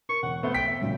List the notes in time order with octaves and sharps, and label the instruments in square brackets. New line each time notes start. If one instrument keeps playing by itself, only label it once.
[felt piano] A#4 [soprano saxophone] C#6
[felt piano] E1 [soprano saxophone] F#5
[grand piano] A3 B3 [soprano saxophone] C5
[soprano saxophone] G5 [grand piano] B6
[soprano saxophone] E5
[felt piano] A#2 C#3 F#3